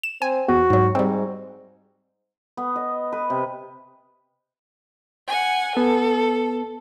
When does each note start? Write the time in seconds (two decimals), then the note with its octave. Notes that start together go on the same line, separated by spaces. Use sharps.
0.03 E7
0.22 C4 G#5
0.48 E2 F#4
0.70 G#2 F#3
0.95 G#2 G3 C4
2.57 B3
2.76 D#5
3.13 B4
3.30 C3
5.28 F#5 G#5
5.77 B3 A4